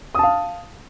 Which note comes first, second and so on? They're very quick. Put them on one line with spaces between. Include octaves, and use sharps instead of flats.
D#6 A5 F5